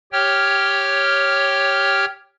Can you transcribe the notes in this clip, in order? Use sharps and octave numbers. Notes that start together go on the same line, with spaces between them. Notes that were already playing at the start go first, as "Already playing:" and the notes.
G4 C#5 G5 F6